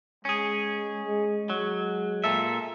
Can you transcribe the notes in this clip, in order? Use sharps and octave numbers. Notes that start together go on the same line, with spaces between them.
G#3 C#4 G#4
G#3
F#3 G#3
A#2 A4 E5